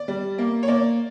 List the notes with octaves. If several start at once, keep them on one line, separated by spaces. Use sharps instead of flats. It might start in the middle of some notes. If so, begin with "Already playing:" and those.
Already playing: D5
G3
A#3
C#5
A#3 D5